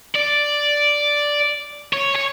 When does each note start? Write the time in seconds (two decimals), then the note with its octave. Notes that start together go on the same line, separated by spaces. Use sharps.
0.15 D5
1.93 C#5
2.16 C#5